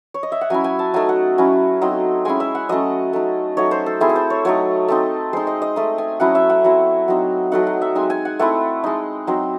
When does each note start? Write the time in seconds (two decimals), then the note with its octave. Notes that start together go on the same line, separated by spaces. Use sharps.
0.14 C#5
0.23 D#5
0.32 E5
0.41 F#5
0.50 F#3 C#4 E4 G#5
0.64 G#5
0.79 A5
0.94 F#3 A3 D#4 G#5
1.09 F#5
1.38 F#3 C#4 E4
1.81 F#3 C4 D#4
2.25 G#3 C#4 E4 G#5
2.40 E5
2.55 F#5
2.69 F#3 A3 C#4 D#5
3.13 A3 D#4
3.57 F#3 A3 D#4 C#5
3.71 C5
3.86 A4
4.00 A3 C4 E4 G#4
4.09 A4
4.16 C5
4.30 C#5
4.45 F#3 A3 D#4 C#5
4.88 A3 C4 D#4
5.33 G#3 D#4 C5
5.47 D#5
5.62 D#5
5.76 A3 D#4
5.98 G#5
6.20 F#3 C#4 E4 F#5
6.35 E5
6.50 F#5
6.64 F#3 C4 E4
7.08 F#3 C4 D#4
7.52 F#3 A3 D#4 F#5
7.67 F#5
7.81 E5
7.95 G#3 C4 D#4 G#5
8.10 G#5
8.25 F#5
8.39 A3 C4 E4 F#5
8.84 G#3 D#4
9.27 F#3 C4 D#4